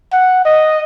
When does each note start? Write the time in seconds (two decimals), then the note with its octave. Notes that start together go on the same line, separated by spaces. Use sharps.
0.13 F#5
0.45 D#5